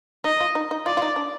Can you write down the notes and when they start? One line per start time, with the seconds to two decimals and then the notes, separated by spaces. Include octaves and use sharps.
0.24 D#4 D#5
0.40 F4
0.55 D#4
0.71 D#4
0.86 F4 D5
0.97 F4
1.02 D#4
1.16 D4